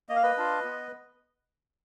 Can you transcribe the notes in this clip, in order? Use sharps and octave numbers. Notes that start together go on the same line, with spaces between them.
A#3 D#5
F5
B4 D#5
D4 F4
B3